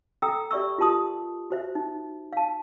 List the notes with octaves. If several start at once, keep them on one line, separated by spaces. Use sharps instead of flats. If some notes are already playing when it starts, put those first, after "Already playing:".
A4 G5 A#5 D#6 E6
G4 D5 E5 C#6 E6
F4 G4 A#4 A5 C6 D#6
F#4 C5 E5
D#4
F5 A5